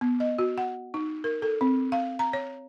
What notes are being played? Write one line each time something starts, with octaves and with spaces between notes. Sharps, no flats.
B3
D#5
F#4
F#5
D#4
A#4
A4
C4
F5
A#5
C#5